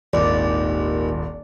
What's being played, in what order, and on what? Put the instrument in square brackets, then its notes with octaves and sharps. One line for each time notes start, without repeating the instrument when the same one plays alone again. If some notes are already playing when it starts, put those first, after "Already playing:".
[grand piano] D#1 G#1 [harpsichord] D#2 [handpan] D5